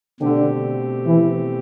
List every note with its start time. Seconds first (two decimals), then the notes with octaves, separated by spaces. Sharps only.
0.20 B2 D3 A3 C4 G4
1.06 E3